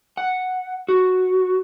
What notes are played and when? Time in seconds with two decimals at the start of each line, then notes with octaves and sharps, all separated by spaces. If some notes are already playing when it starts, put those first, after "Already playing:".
0.17 F#5
0.89 F#4